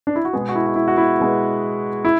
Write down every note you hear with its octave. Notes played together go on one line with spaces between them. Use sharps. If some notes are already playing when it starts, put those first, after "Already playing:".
D4
E4
F#4
B2 G#3 B3 G#4
F#4
E4
F#4
E4
F#4
E4
B2 G#3 B3
E4